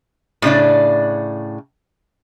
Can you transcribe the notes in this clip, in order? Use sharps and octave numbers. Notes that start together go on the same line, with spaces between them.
A2 C#3 D4 D5